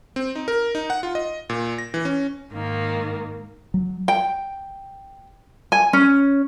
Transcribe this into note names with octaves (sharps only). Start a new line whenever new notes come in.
C4
D#4
A#4
D#4
F#5
F4
D#5
A#2
A#6
E3
C#4
G#2 D#3 A#3
F#3
G5
G#5
C#4